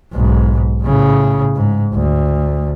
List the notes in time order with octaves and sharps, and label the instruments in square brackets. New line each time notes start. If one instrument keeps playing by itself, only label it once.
[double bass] B1 G#2
A2 C#3
G#2
D2